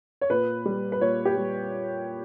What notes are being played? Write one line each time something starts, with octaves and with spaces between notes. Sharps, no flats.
C#5
A#2 B4
G3
B4
A#2 C#5
G4
G3